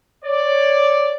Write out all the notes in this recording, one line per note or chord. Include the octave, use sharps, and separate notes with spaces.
C#5 D5